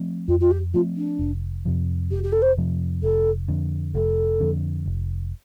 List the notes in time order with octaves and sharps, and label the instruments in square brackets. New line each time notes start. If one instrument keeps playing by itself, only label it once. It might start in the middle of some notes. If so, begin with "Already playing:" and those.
Already playing: [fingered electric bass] F3 A3 C4
[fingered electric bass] F2 [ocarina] F4
[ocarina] F4
G4
[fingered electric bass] F3 A3 C4 [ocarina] F4
[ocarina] D4
[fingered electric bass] F1
F2 C3 F3
[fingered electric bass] F1 [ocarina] G4
[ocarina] G4
A4
C5
[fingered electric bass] F2 C3 F3
[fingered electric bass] F1 [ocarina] A4
[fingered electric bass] F2 D3
[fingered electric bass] F1 [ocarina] A4
[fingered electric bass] F2 D3
F1